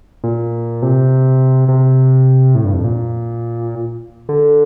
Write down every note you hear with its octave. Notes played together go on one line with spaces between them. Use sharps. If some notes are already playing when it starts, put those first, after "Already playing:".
A#2
C3
C3
A2
G2
F2
A#2
D3